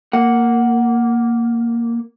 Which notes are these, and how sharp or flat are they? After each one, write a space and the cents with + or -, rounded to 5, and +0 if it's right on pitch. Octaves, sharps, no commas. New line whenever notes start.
A#3 -5 F#5 +0